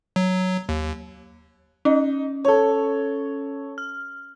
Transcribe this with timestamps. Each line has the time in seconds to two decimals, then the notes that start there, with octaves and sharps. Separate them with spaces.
0.16 F#3
0.69 D#2
1.85 C#4 D#4
2.45 A4 C#5
3.78 F6